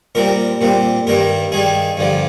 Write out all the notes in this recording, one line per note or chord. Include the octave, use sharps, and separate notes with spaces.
A#2 G3 C4 A#4
A#2 G3 C4
G2 D#3 G3 A#4
G2 D#3 G3 G#4
G2 D3 F3